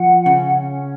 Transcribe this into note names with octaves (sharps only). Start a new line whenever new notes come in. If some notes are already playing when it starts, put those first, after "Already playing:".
Already playing: F3 F#5
C#3 C#4
C#4